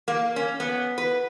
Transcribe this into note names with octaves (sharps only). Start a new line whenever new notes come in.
A#3
C#4
B3
B4